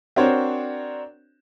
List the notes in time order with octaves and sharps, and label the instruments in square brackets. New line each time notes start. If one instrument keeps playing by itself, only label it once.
[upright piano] C4 D4 F#4 A#4 C5 C#5